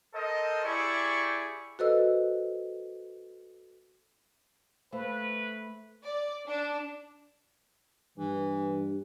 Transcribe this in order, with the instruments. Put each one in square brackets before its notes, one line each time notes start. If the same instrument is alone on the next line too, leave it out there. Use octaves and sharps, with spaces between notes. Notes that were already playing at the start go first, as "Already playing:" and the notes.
[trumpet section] A4 A#4 C5 D#5
E4 G4 G#4 D5 C#6
[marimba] F#4 A4 B4 C5 D#5 E6
[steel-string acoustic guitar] A3 [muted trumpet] B4 [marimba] C5 F5
[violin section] D5
D4
[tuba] G2 [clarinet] E3